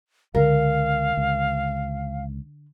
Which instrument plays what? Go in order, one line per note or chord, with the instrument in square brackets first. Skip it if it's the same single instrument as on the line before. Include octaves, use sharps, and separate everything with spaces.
[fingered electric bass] C#2 [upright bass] D3 [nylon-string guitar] A#4 [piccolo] F5
[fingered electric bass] C#2